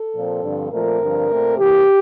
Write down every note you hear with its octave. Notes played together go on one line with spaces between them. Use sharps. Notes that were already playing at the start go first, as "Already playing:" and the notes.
Already playing: A4
A#2 F3 C4
G2 D3 F3 C4
A#2 F3 A3 C4 A#4
G2 D3 F3 C4
A#2 A3 C4
C3 E3 A#3 G4